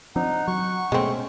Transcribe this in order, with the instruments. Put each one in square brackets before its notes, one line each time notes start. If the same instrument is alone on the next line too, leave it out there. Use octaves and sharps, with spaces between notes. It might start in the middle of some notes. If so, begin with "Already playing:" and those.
[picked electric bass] F3 C4 D4 [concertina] D#4 [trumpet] F#5
[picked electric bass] F#3 [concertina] C#6
[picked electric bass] B2 A3 [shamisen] G#3 C4 [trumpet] C#4